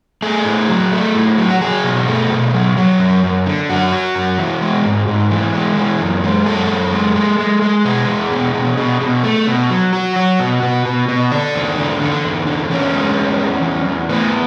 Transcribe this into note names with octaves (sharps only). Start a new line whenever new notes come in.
A3 G#4
A2
F#3
A3
A2
F#3
F#4
F#3 G#4
B2
A3
B2
F#3
F#3
F#2
F#2
D3
F#2 F#4
F#3
F#2
E3
G#3
G#2
G#2
E3
G#3
E3
F#2
G#3
F#2 A4
F#2
G#3
G#3
G#3
G#3
B2 G#4
E2
B2
B2
B2
B2
A3
B2
F#3
F#3 F#4
F#3
B2
B2
B2
B2
D3 D4
E2
D3
D3
E2
D3
E2 C#4
G#3
E2
E2
E2
E2
A2 B3